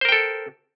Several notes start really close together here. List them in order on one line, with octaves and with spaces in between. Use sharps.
C5 A#4 G5 A4